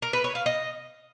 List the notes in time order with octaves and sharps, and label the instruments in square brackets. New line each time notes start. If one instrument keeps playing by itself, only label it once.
[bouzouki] A#4
B4
C#5
F5
D#5